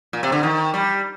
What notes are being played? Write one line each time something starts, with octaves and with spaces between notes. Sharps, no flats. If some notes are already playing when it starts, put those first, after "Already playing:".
A#2
C3
D3
D#3
G3